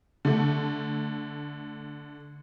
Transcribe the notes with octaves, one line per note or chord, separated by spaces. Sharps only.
D3 A3